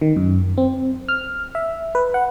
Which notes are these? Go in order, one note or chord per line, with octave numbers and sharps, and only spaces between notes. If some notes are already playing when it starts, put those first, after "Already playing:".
D#3
F#2
C4
F6
E5
B4
F#5